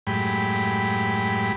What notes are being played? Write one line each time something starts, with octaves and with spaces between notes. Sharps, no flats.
F#2 A2 G#3 G4 B5